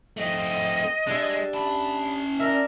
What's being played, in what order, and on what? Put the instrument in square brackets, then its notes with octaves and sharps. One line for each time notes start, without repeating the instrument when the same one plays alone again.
[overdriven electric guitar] A3 C4 [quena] D#5
[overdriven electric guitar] G#3 [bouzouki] D4 G4 E5
[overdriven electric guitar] C#4 A5 [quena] B5
[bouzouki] D4 E5 [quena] A#4